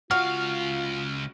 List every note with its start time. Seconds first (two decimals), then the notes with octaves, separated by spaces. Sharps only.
0.11 C#2 F4 F#4 F5 F6